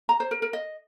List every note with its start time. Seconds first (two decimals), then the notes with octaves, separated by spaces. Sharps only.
0.09 A#5
0.20 C5
0.31 A#4
0.42 A#4
0.53 D#5